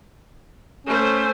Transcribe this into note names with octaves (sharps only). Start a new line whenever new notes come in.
A3 C#4 C5